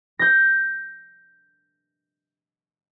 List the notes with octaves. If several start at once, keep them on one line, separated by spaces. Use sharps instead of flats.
G6 A#6